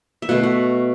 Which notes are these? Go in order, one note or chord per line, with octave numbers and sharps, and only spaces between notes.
E5
B2 A3 F#5
F#5